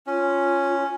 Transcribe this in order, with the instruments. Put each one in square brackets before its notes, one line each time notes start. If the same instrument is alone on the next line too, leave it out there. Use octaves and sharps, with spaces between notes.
[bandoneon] C#4 [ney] F4